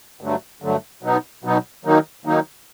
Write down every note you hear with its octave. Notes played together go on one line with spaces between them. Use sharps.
G2 D3 F#3 A3
G2 D3 F#3 A3
B2 F#3 B3 D#4
B2 F#3 B3 D#4
D#3 F#3 A#3 D#4
D#3 F#3 A#3 D#4